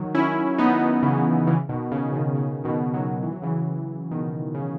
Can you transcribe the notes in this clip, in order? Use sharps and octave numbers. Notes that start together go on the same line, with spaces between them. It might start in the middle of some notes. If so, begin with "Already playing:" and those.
Already playing: D#3 F#3
C#4 E4
B3 D#4
C#3 E3
C#3 E3
B2 D#3
C#3
B2 D#3
C#3
B2 D#3
D#3 F#3
E3
F#3
C#3 E3
B2 D#3
C#3